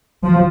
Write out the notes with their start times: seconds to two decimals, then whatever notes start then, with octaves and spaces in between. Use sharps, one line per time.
0.24 F3